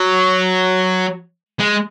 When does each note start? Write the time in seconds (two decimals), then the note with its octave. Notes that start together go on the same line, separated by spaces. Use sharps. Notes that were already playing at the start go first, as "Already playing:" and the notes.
Already playing: F#3
1.60 G#3